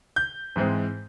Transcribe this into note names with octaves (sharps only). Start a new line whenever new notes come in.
G6
G#2 E3 G#3 C4